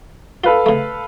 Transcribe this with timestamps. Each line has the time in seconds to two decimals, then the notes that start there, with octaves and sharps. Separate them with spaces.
0.44 F4 A4 B4 F5
0.66 C#3 A3